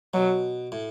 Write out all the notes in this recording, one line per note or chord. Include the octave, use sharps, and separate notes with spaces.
B2 F#3
A2